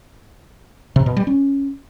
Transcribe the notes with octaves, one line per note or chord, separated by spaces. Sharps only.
C3
B2
G3
C#4